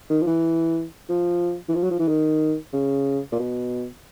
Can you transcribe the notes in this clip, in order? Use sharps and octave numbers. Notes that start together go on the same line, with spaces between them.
D#3
F3
E3
F3
E3
F3
F#3
F3
E3
D#3
C#3
A#2
B2